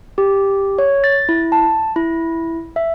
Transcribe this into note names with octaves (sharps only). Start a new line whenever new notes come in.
G4
C#5
A6
E4
A5
E4
E5